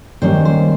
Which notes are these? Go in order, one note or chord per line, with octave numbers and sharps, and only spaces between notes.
D#3 G3 A#3 C#4 C5
C5